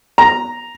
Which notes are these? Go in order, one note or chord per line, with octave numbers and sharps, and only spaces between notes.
A#5